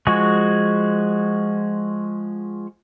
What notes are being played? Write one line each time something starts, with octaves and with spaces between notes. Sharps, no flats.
F3 G#3 F#4 G#4 C#6